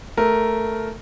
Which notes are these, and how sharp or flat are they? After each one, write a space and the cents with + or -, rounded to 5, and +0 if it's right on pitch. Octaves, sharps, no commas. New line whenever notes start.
A3 +0 A#4 +0